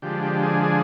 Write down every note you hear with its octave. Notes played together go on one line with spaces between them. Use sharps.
D3 F3 G#3 D4 G4
G4
G#4
G#4